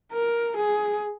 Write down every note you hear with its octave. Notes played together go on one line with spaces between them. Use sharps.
A#4
G#4